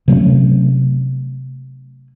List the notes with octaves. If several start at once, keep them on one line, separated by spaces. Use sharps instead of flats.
C3 F#3 A3 C#4